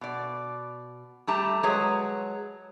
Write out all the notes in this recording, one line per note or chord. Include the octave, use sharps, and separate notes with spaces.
B2 D5
G3 A3 G4 A5 A#5
F#3 G#3 G#4 B4 C#5 A#5